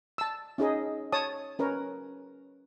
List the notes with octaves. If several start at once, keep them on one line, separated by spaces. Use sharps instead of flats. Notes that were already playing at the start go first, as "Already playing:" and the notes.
A5 E6
C#4 D#4 G#4 D#5
C#5 A5 D#6
C#4 A#4 B4 C#5